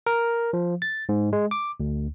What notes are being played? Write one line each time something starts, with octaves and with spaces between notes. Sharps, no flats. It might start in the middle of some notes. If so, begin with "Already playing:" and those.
A#4
F3
A6
G#2
G#3
D6
D2